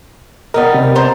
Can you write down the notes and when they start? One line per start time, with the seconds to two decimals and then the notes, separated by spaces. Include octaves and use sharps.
0.54 G3 B3 D#4 A#4 D#5
0.74 C3
0.95 C5 A5 A#5